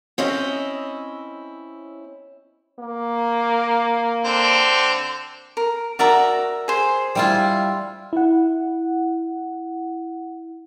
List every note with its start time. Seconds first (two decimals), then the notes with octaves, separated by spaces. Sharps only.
0.18 C4 C#4 E4 D#5
2.79 A#3
4.25 D3 C4
5.57 A#4
5.99 F#4 A#4 D5 E5 A#5
6.68 G#4 C5
7.15 G3 E4 F4
8.13 E4 F#5